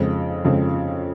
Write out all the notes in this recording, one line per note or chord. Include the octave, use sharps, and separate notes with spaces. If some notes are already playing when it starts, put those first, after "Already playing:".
Already playing: F2 C#3 G#3 C4
F2 C#3 G#3 C4